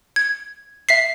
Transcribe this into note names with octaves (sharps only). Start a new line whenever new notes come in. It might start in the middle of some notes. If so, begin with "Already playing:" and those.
G#6
E5 B6 C7